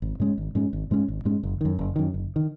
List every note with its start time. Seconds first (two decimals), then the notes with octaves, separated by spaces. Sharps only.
0.02 G#1
0.20 G#2 G#3 C#4
0.38 G#1
0.55 G#2 G#3 C#4
0.73 G#1
0.91 G#2 G#3 C#4
1.08 G#1
1.25 G#2 G#3 C#4
1.43 F#1
1.61 F#2 D#3
1.79 F#1
1.96 F#2 D#3
2.14 F#1
2.36 D#3